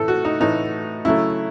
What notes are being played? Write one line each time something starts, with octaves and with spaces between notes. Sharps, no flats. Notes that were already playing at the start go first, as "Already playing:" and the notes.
Already playing: A2 E3 A3 A4
F#4
D#4
A2 E3 A3 D#4
C#3 F#3 A3 E4